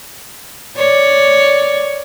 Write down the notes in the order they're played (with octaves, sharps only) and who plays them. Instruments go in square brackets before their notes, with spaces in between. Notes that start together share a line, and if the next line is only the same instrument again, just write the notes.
[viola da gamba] C#5 D5